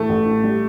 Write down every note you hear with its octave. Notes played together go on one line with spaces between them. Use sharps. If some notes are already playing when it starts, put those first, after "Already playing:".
Already playing: A2 E3 A3
A1
A2
G3